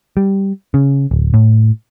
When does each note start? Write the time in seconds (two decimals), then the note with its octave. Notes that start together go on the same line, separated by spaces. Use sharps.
0.17 G3
0.74 C#3
1.11 D1
1.34 A2